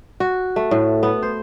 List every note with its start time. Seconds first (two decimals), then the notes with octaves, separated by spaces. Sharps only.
0.20 F#4
0.56 A3
0.71 A2
1.03 B3
1.23 C5